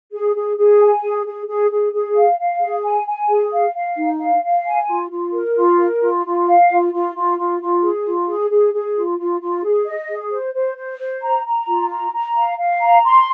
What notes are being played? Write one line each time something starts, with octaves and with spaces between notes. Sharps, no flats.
G#4
G#4
G#4
G#5
G#4
G#4
G#4
G#4
G#4
F5
F5
G#4
G#5
G#5
G#4
F5
F5
D#4
F5
F5
G#5
F4
F4
A#4
F4
A#4
F4
F4
F5
F4
F4
F4
F4
F4
G#4
F4
G#4
G#4
G#4
F4
F4
F4
G#4
D#5
G#4
C5
C5
C5
C5
A#5
A#5
F4
A#5
A#5
F5
F5
A#5
C6